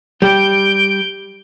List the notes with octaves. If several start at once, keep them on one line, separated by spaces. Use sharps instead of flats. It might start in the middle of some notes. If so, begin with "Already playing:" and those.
G3 G6 D7